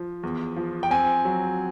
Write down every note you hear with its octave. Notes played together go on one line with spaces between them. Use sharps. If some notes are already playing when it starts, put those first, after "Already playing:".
Already playing: F3
E2
F3
G5
C4 G#5
F#3